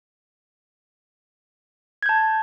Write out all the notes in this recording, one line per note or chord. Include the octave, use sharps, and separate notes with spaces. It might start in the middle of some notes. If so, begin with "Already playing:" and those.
A5 G6 G#6